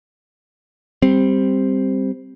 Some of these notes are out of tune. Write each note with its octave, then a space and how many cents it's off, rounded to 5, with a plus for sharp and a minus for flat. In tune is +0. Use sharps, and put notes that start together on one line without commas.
G3 +5 C4 +0